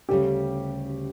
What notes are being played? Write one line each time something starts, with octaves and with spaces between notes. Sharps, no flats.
D2 C#3 G3 G4